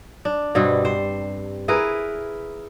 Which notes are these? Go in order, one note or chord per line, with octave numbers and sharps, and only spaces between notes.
D4
G2 B2 G3 C4
C5
E4 G#4 A#4 B4